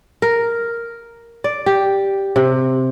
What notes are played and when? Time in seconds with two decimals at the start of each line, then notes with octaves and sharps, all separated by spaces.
0.22 A#4
1.44 D5
1.66 G4
2.36 C3